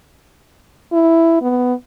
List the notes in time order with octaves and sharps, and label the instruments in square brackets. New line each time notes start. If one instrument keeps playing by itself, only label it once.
[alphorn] E4
B3